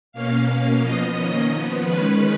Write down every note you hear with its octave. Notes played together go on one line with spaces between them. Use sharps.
B2 A#3 C#4 F5
B2 A#3 C#4 F5
F3 B3 D#5
D#3 A#3 C#4 D#5
F3 B3
D#3 G#3 C#4 B4